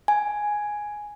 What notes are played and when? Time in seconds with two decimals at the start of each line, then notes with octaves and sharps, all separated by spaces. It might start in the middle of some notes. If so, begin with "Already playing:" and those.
0.08 G#5